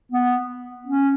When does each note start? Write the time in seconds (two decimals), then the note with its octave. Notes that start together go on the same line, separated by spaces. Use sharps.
0.12 B3
0.87 C#4